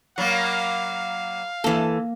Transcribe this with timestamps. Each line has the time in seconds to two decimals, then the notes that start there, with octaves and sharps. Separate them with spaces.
0.18 F#3 A#3 D5 F5 B5
1.64 E3 A#3 A4